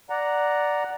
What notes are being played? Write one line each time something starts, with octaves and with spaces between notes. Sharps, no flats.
D5 F#5 A#5